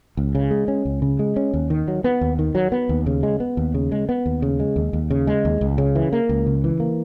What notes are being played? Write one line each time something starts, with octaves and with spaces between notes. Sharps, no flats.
C#2
C#3
G#3
C#4
C#2
C#3
G#3
C#4
D#2
D#3
F#3
B3
D#2
D#3
F#3
B3
D#2
C#3
G#3
B3
D#2
C#3
G#3
B3
D#2
C#3
G#3
D#2
D#2
C#3
G#3
D#2
C#2
C#3
E3
A#3
C#2
C#3
E3
A#3